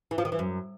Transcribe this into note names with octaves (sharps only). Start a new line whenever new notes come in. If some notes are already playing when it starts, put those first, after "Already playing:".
E3
F3
D#3
E3
F#2